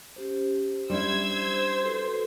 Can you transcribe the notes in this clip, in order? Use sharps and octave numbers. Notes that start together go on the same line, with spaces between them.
C#4 G4 C5
G3 C#4 D4 E4 C5 E6 G#6
F#4 A4 B4